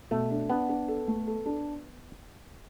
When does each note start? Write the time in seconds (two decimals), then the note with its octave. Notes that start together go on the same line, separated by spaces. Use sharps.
0.11 B2 A3
0.31 D4
0.50 B3 D4
0.69 D4
0.88 A4
1.08 A3
1.27 A4
1.46 D4